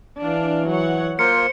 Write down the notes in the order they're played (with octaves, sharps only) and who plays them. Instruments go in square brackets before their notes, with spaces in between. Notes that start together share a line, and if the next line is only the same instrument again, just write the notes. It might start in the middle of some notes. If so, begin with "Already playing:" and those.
[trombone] E3 [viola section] D4 F5
[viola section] F#3 C#5 F#5
[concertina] A#3 F4 A#4 [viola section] C5 [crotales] C#7